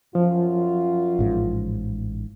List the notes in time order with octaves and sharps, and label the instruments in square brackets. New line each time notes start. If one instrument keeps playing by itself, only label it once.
[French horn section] F#2 F4 [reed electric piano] F3
[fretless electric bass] A1 G#2